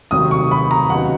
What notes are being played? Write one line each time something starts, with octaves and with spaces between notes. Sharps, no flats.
F1 D#2 D#3 F#3 D#6
C#6
B5
A#5
D#2 C#3 F#3 B3 D#4 F#5